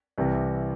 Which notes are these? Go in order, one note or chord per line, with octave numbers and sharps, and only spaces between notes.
C2 C3 E3